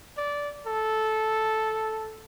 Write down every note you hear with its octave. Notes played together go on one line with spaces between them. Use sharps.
D5
A4